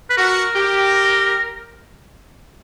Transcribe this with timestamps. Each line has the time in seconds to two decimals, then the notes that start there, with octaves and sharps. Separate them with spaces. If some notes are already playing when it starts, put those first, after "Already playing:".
0.10 B4
0.17 F#4 A#4
0.56 G4